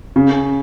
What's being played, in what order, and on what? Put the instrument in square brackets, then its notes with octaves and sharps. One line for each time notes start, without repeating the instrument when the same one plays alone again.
[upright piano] C#3